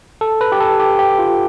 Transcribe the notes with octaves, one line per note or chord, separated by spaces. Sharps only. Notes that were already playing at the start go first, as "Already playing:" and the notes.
A4
B4
G4
A4
G4
G4
F4